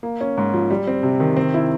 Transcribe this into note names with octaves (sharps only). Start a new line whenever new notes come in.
A#3
C#4
G#2
F3
G3
C4
C3
D#3
C4
E4